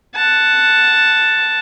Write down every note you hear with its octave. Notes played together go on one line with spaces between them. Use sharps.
F#5 A5